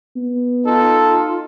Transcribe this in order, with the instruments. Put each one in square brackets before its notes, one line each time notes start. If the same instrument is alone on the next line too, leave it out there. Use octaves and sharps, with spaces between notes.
[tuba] B3
[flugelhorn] D#4 [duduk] F4 [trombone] A4